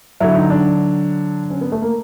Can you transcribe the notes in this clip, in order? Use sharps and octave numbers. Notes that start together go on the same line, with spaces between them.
D3 F#3 E4
D#4
D4
C#4
B3
A3
A#3